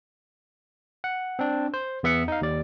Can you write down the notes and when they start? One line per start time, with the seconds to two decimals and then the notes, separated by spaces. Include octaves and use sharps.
1.04 F#5
1.39 C4 D4
1.74 C5
2.03 E2 B3 E5 F#5 C#7
2.28 D#4 F5
2.41 D#2 D5